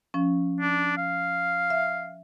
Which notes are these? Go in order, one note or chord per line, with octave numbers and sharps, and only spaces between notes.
F3 C#4
D4
F5
E5